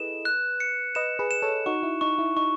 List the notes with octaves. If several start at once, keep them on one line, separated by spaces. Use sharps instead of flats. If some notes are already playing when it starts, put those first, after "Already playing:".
Already playing: E4 G#4 A4 B4 D#5 E7
F#6
C#7
B4 D#5 E7
G#4 B4
E7
A4 C#5
D#4 F#4 C#6
E4
D#4 C#6
E4
D#4 C#6